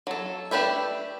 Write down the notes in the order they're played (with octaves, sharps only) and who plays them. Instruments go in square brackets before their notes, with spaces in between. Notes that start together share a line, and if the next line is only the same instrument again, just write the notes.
[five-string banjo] F#3 A4
A3 D4 G4 B4 E5